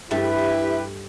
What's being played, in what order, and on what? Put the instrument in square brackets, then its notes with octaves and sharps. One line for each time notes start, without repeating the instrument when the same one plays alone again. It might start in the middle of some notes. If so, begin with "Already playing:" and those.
[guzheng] G2 A3 A4 [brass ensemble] E4 G4 B4 [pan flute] E5